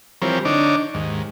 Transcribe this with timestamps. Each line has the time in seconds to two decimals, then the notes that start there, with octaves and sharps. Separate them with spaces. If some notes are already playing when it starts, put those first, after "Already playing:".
0.22 E3 F3 G3 C4 A#4 C#5
0.45 D3 D4 D#4 C#5 D6
0.94 D#2 G#2